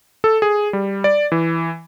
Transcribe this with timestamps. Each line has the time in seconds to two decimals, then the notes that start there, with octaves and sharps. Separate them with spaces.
0.24 A4
0.42 G#4
0.73 G3
1.04 D5
1.32 E3